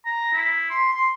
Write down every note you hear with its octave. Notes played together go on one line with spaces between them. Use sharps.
A#5
E4
C6
C6